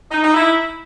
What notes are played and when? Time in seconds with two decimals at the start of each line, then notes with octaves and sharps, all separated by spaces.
0.11 D#4
0.23 D#4
0.34 E4